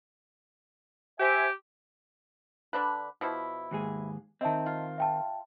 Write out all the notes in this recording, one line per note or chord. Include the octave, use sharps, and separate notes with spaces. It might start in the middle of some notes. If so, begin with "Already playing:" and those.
G4 C5 E5 G#5
D3 D4 B4
B2 F3 E4
D#2 G#2 G#4
D#3 C4 D#5 E5 A5
F4
E5 G5 A5